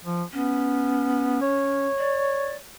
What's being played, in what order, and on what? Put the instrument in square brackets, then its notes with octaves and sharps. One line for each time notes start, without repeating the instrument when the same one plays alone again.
[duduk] F3
[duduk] B3 [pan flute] C#4
[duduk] C#5
[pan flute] D5